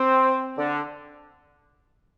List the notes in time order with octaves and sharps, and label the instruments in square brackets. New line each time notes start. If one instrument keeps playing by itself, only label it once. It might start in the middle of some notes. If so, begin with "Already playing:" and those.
Already playing: [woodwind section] C4
D3